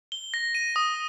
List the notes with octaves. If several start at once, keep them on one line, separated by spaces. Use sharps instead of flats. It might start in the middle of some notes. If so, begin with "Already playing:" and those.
G7
A#6
D#7
D#6